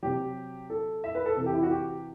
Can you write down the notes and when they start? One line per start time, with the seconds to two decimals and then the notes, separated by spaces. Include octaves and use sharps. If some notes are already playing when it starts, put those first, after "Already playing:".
0.03 C3 F#3 G4
0.70 A4
1.04 E5
1.15 B4
1.26 A4
1.37 C3 E3 A4
1.46 G4
1.54 E4
1.63 F#4
1.71 G4